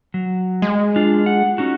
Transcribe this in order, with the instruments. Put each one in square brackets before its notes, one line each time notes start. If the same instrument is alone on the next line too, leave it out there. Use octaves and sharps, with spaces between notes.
[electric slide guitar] F#3
[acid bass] G#3
[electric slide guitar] D4 F4
F#5
C#4 D#4 F#4